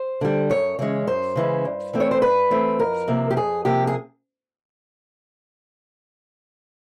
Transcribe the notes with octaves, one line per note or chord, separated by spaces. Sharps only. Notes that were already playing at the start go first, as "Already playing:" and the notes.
Already playing: C5
D3 G3
F#2 C#5
C#3 E3 G#3 C#4 C#5
F#2 C5
C#3 E3 G#3 C#4
G2
E3 A3 C4
C#5
C5
G2 B4
E3 A3 C4
F2 A#4
C3 F3 A#3
G4
F2 G#4
C3 F3 A#3 G4
G#4